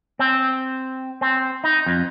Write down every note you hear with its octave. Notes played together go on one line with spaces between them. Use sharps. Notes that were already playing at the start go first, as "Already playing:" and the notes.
C4
C4
D#4
F2